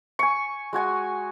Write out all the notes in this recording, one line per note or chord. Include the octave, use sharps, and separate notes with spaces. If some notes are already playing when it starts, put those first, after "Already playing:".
G#5 C#6
G#3 F#4 G#5 C#6